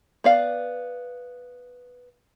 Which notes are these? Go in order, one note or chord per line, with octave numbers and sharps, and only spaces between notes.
B3 D5 F5